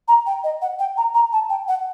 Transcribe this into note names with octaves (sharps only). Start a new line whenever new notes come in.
A#5
G5
D#5
F#5
G5
A#5
A#5
A5
G5
F#5